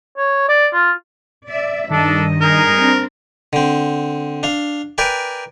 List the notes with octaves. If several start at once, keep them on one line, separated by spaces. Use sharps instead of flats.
C#5
D5
F4
D5 E5
G2 D#3 D4 A4 D#5
D#4 G#4 A#4
C4 D4
D3 C4
D4 F5
A#4 B4 D5 G5 G#5